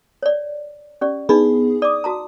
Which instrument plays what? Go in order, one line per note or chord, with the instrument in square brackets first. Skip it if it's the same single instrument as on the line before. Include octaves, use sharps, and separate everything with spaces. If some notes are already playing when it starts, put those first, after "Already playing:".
[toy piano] C#5 D5
C#4 G4 D5
[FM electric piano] B3 G#4 [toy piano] D4 D#4 B5
[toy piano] D5 D6 [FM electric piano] D#6
[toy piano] F#4 A5 A#5